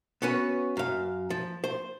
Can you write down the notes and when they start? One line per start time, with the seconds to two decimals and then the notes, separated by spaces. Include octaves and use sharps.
0.22 B3 C#4 F#4 B4
0.77 F#2 F5
1.30 F3
1.64 C5